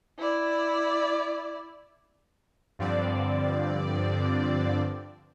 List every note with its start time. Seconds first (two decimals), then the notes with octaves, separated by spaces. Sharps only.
0.19 E4 D5
2.79 G2 D3 F3 C4 D5